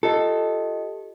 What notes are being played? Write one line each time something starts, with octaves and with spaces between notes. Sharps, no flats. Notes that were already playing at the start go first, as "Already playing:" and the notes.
F4 G4 A4 D#5